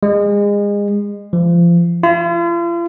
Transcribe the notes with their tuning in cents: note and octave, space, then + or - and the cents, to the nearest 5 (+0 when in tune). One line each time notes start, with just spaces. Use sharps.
G#3 -30
F3 -30
F4 -45